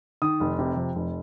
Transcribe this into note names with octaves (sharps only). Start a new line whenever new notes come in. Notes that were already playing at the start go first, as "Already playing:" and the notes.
D#3 D#6
F1
C3
F2
F1